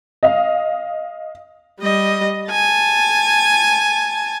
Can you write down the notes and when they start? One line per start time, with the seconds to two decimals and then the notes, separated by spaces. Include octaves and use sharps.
0.23 D#5 F5
1.80 G3 D#5
2.50 G#5 A5